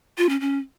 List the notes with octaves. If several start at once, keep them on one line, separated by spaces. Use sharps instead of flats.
F4
C#4
C#4